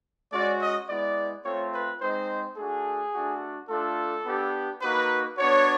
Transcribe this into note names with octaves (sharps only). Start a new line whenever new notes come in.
G#3 C#4 F#4 D5
D#5
G#3 B3 E4 D5
A3 C4 F4 C#5
B4
G#3 C4 D#4 C5
A3 D4 F#4 G#4
A3 D4 F#4
A3 D4 F4 A4
B3 D4 G4
A#3 D#4 F#4 B4
B3 D4 F#4 C#5